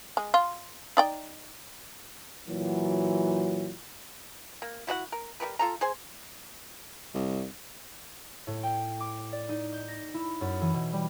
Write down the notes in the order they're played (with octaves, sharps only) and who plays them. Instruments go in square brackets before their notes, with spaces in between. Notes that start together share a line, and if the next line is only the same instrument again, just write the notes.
[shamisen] G#3
F4
D#4 D5 G5
[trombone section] A#2 E3 F#3
[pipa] A#3
E4 F#4 D5 F#5
A#4
G3 F#4 A#4 B4
F4 A4 A#5
G#4 C5 G#5
[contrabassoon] C2
[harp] A2
G5
D6
D5
D#4
G6
A#6
E4
F#2
E3
B2
G3